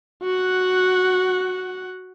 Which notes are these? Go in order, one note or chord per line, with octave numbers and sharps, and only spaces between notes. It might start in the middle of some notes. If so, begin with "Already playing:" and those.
F#4 F#5